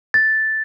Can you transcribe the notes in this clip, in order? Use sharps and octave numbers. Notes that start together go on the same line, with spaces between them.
A6